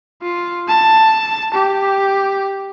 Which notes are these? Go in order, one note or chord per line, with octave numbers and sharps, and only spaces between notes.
F4
A5
G4